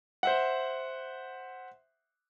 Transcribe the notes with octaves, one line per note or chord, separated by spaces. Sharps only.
C5 E5 F#5